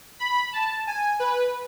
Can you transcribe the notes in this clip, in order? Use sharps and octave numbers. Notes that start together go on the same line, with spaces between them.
B5
A5
G#5
B4